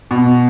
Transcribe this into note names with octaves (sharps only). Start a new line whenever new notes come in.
B2